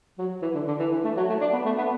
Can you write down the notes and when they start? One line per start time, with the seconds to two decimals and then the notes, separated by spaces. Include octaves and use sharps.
0.18 F#3
0.42 E3
0.55 D3
0.68 D3
0.79 E3
0.92 E3
1.05 A3
1.17 F#3
1.29 A3
1.41 D4
1.53 B3
1.66 A3
1.78 B3